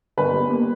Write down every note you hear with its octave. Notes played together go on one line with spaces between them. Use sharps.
G1 B4
G3
A#3